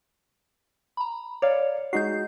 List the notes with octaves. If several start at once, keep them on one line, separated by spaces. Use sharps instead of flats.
A#5 B5
C#5 D5 F5
G#3 D#4 F#4 G6 C7